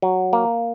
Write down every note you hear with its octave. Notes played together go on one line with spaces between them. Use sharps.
F#3
A#3